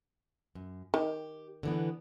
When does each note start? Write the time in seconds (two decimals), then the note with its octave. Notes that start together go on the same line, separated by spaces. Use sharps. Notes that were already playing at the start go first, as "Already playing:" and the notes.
0.55 F#2
0.94 D#3 G4
1.63 D3 E3 B3